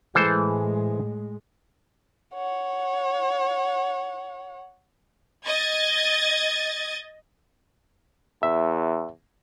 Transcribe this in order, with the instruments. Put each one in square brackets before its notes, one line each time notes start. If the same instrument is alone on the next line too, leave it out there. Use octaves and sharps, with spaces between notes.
[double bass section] A2 G#3 [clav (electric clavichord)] E3 A4 C5
[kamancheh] C#5 F#5
[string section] D#5 G#6 A6
[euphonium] E2 [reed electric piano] E5